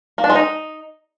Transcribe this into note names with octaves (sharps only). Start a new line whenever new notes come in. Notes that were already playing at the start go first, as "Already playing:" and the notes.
A#3
D4
G#3
D#4